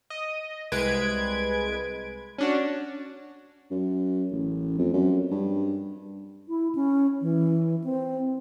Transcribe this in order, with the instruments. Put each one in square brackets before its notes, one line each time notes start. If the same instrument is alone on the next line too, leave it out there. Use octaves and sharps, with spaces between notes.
[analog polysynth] D#5
C2 G#3 B4 G#6 D7
C#4 D4 F#4
[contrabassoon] F#2
A1
F2
F#2
G2
[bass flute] E4
C#4
E3
C4